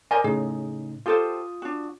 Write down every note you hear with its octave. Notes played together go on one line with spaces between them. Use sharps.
A#4 C5 D5 D#5 G#5
A2 C#3 D#4 G#4
F4 G4 A4 C5 D#6
D4 F#4